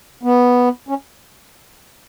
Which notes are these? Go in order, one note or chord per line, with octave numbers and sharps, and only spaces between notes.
B3
C#4